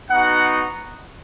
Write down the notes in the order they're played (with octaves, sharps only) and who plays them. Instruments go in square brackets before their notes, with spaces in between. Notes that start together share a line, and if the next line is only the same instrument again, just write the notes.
[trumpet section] B3 D#4 F#4 F#5